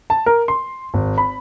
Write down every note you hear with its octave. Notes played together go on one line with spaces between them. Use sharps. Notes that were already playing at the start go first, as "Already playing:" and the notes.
A5
A#4
C6
G#1
B5